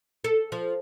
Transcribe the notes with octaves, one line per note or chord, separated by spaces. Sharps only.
A4
F3